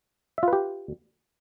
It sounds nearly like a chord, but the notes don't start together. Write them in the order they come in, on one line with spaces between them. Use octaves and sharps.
E5 F4 B4 G4